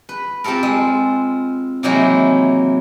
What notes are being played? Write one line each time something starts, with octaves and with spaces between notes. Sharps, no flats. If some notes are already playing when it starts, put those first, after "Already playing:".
B4
C4 F4 G4 A4 A#4
G#3
C3 D#3 E3 F#3 G#3 A#3